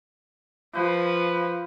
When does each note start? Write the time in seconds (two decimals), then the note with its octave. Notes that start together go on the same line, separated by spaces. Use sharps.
0.75 F3 B4